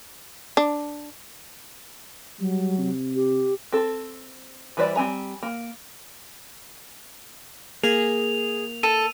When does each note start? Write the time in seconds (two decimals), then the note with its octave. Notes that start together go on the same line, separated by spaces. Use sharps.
0.57 D4
2.39 F#3 G3
2.78 C3
3.16 G4
3.72 C4 A4
4.77 E3 G3 B4 C5 D5
4.96 G3 C4 G#5 A#5
5.43 A#3
7.84 A#3 G#4 F7
8.83 A4 D#7